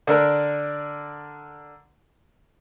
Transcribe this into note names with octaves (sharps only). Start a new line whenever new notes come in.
D3 D4 A#4